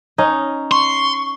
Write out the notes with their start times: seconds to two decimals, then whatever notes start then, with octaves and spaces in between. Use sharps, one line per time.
0.18 C#4 D#4
0.72 C6 C#6